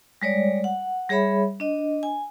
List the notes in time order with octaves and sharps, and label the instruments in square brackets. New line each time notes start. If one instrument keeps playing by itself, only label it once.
[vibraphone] G3 G#3 C#5 D5
F#5
G3 G#4 C#5 E5 B5
D4 D#5
G#5